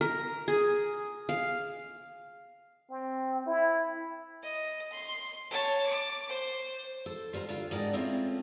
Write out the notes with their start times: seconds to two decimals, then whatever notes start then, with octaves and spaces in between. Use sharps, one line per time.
0.01 A#4
0.48 G#4
1.29 F5
2.91 C4
3.46 E4
4.43 D#5
4.92 C6
5.50 C#5 A5
5.86 D6
6.29 C5
7.06 A4
7.33 G3 F4 C5 A#5
7.49 D3 F4
7.71 G#2 D4 D#4 A#4 D5 G5
7.93 G#3 A3 C4 C#4 E4 F4